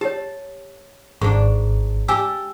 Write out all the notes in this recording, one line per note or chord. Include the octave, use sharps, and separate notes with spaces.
G4 C#5 A5
G#1 G#2 D4 C#6
G4 G#5 A5 E6